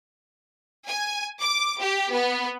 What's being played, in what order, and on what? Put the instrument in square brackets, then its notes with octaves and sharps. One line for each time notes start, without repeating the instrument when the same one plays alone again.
[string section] G#5
D6
G4
B3